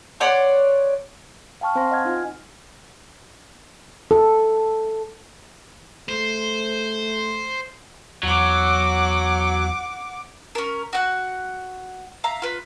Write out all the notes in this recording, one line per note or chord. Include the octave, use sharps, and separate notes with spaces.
C#5 D5 F#5 C6
F5 G5 A5 C#6 F6
C4 C5 F5 G#5 C6 A#6
D#5 F#5 F6 G#6
D#4 F4 G#5
A4
A3 C5
E2 F#3 F#5 D6
C#4 A#4
F#4 F#5
E5 F5 A#5
F4 B4